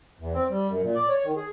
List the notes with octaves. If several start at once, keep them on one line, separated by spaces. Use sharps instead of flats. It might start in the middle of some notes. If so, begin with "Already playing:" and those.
E2
C4
G3
F#2
A#2
D5
C#5
D#3
G#4